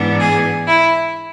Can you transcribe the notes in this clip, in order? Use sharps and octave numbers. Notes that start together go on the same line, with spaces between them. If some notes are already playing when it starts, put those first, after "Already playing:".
Already playing: G#2 E3 B3 D4
G#4
E4